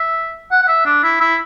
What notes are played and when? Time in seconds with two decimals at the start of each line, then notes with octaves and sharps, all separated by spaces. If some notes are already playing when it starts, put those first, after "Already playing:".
Already playing: E5
0.52 F#5
0.62 F#5
0.68 E5
0.86 D4
1.03 E4
1.20 E4